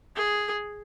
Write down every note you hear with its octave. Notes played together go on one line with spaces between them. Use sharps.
G#4